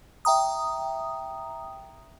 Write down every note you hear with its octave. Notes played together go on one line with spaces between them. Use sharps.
E5 G5 A#5 D#6